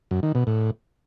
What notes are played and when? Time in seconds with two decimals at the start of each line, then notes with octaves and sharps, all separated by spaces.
0.11 F#2
0.23 D#3
0.35 B2
0.47 A2